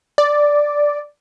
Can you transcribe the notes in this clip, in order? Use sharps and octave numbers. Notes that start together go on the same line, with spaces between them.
D5